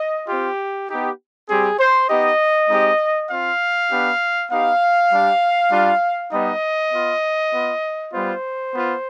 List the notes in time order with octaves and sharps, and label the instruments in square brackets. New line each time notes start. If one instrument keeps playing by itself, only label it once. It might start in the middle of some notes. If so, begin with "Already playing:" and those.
Already playing: [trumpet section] D#5
C4 F4 G4
B3 D#4 G4
G3 C4 G4 G#4
C5
B3 D#4 G4 D#5
G#3 C4 D#4 G4
C4 F4 F5
B3 D4 G4
B3 D#4 G4 F5
G3 D4 G4
G3 D4 F4
G3 B3 D#4 D#5
B3 F4
B3 F4
G3 B3 F4 C5
B3 F4